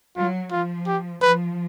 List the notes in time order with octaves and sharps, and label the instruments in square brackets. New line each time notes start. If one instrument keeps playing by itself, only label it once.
[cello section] F#3 [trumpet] F4
[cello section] F3 [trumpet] F4
[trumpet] G4
[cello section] F3 [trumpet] B4